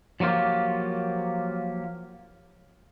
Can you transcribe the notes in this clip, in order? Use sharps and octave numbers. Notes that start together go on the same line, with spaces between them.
F3 F#3 A#3 F4 G4